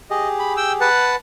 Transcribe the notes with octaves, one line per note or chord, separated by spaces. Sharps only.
G4 G#4 D#5
B5
G5 E6
B4 F#5 A5